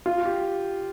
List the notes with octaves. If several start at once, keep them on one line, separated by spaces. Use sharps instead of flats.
F4
G4